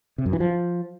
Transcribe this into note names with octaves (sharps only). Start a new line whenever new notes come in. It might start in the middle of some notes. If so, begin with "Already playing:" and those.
C3
F#2
E3
F3